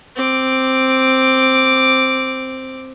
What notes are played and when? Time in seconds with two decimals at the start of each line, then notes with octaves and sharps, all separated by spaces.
0.16 C4 D6